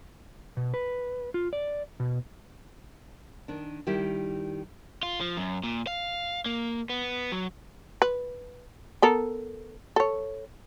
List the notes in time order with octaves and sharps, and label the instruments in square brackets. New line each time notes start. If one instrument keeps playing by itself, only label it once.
[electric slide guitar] B2
B4
F4
D5
B2
[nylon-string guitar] D#3 D4
D#3 G3 E4 G4
[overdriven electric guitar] F4
F3
F#2
A#2
F5
A#3
B3
F#3
[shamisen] B4
B3 A4 A#4
A4 C#5